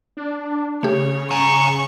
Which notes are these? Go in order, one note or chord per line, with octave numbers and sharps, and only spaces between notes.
D4
C#3 A3 G4 C#5
G#5 A#5 C#6